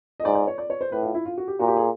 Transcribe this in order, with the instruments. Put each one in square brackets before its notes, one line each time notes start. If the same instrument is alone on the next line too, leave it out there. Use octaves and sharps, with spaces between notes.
[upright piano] D#5
[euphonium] G#2 [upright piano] D5
[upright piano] D5
C#5
D5
C#5
C5
[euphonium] A2 [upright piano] B4
[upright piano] F4
E4
F4
F#4
G4
[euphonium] A#2 [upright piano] F#4
[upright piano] G4
G#4